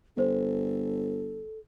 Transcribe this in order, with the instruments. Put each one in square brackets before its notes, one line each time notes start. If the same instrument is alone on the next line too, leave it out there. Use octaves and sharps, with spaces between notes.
[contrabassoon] G1 [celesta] D4 C5 [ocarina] A4